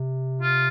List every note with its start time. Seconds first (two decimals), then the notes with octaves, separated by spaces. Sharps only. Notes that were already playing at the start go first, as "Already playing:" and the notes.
Already playing: C3
0.41 F4